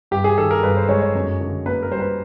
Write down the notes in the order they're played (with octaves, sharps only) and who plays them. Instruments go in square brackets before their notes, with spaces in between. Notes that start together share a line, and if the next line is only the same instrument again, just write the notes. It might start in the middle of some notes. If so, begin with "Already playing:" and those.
[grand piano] G2 G4
G#4
D#3 A4
A#4
G2 B4
C5
G#3 C#5
C#5
F#2
D3
A#3 B4
A#4
G3 C5
B4